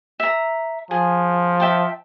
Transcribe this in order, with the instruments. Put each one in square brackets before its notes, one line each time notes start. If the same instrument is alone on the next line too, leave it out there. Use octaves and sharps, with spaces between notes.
[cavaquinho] E5 A#5
[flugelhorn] F3 [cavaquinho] G#4
[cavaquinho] E5 G5 A5